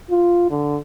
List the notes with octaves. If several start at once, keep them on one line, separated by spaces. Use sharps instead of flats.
F4
D3